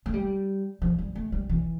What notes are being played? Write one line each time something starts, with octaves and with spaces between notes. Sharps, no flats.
A3
G3
F3
G3
A3
G3
E3